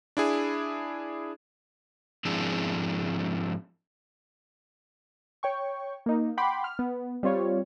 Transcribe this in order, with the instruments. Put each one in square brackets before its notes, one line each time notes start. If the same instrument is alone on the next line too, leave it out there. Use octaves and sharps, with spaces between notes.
[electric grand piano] D4 E4 G#4
[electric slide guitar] G#2 F3 C4 D4 E4 G#4
[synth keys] C#5 G5 C#6
A#3 D#4
F#5 G5 B5 C6 D6
F6
B3
G3 C4 F4 C#5